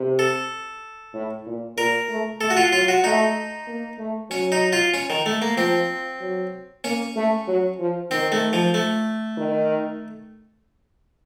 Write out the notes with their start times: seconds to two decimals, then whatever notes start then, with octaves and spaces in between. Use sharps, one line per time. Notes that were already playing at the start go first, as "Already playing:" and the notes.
Already playing: C3
0.19 A4
1.14 A2
1.46 A#2
1.77 A#2 A#4
2.09 A3
2.41 A3 A4
2.50 F#4
2.57 F4
2.72 F#3 F4
2.88 F#4
3.04 A3 D#4
3.67 A#3
3.99 A3
4.30 F#3 C#4
4.52 D#4
4.73 F4
4.94 C#4
5.10 D#3
5.26 A3
5.42 A#3
5.57 F3 C4
6.21 F#3
6.84 A#3 C#4
7.16 A3
7.48 F#3
7.80 F3
8.11 D#3 C4
8.32 A3
8.53 F3
8.74 A3
9.37 D#3